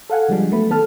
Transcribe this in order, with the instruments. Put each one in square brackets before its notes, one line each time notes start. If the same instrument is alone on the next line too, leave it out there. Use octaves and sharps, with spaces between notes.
[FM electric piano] A4 F5 F#5 G#5
D3 F3 G3 G#3 D4
F#3 A3 B3 B5
D#3 B3 A4 A5 F6